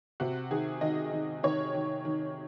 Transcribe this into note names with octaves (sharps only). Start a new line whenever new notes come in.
C3 F#4
D#3 G#4
D#3 D#5
D#3
D#3 C#5
D#3
D#3